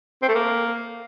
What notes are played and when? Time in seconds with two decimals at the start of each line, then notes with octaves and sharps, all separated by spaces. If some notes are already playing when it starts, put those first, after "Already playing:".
0.22 C4
0.28 A3
0.35 A#3